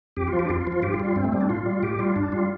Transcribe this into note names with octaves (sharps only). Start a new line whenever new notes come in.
F2 G4
F4
F3
G4
D4
F2 F4
F4
F3
F4
G2 G4
F4
G3
F4
G2 C4
A3
G3 C4
D4
A2 F4
G3
A2 G4
G3 F4
G2 D4
G3 F4